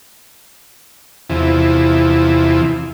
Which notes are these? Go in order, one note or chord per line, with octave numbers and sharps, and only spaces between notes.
E2 C3 E3 F3